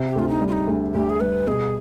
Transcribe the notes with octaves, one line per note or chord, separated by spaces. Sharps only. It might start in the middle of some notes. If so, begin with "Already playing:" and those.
Already playing: C3
G4
D2 F4
D#4
G3
F4
D#4
D2
D2 G4
G#4
G3 B4
B2 G#4